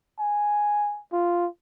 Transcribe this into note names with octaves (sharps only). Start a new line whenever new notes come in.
G#5
F4